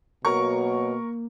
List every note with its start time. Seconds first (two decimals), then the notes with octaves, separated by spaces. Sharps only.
0.25 B2 F#3 A#3 A#4 C#6